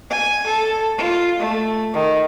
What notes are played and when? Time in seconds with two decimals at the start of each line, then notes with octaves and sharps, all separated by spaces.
0.10 G#5
0.47 A4
0.98 F4
1.39 A3
1.94 D#3